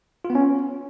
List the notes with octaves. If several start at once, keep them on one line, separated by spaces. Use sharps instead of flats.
F4
B3
C#4